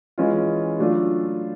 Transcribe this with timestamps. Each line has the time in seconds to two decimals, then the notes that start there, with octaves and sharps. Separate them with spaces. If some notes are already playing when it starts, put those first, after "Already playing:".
0.18 E3 G#3 C#4 F4
0.79 F#3 A3 D4 F4